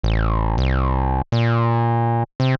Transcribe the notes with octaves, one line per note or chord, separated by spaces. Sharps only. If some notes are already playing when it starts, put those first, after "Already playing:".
A1
C2
A#2
C3